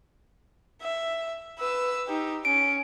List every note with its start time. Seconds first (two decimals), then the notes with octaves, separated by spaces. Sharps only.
0.81 E5
1.58 B4 E6
2.08 D#4 G4
2.45 C#4 D7